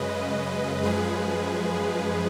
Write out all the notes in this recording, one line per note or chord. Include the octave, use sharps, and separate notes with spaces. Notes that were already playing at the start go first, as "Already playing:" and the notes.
Already playing: F#2 C#3 G#3 B4 D#5
F#2 F3 G#3 G#4 B4